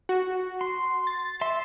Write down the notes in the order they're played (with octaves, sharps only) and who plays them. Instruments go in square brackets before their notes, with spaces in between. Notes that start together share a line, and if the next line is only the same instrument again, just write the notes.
[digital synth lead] F#4
[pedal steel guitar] C6
[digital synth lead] A6
[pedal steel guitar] E5 C6